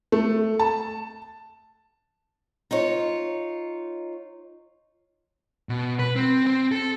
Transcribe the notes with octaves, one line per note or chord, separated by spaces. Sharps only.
A3
A5
D#4 F4 C#5
B2
B4
C4
C4
A4